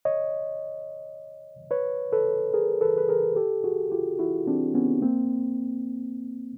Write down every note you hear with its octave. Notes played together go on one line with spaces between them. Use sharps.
C#5 D#5
B4 C#5
A4 B4
G#4 A#4
A4 B4
B4
G#4 A#4
G4 A4
F#4 G#4
F4 G4
E4 F#4
C4 D4
B3 C#4
A#3 C4